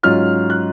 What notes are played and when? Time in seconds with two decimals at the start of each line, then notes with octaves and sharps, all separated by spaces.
0.03 G#2 F#3 C#4 F4 F6
0.50 F#6